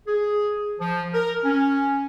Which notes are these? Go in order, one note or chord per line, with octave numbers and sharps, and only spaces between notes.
G#4
F3
A#4
C#4